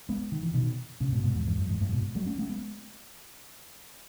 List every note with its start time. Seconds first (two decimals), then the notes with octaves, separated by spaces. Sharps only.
0.09 G#3 B3
0.32 D#3
0.43 E3
0.54 B2 D#3
1.00 A2 C#3
1.12 G#2 B2
1.24 G#2 B2
1.35 E2 G#2
1.47 E2 G#2
1.58 F#2
1.69 E2 G#2
1.81 F#2 A2
1.93 G#2 B2
2.15 F#3 A3
2.26 A3 C#4
2.38 A3 C#4
2.50 G#3 B3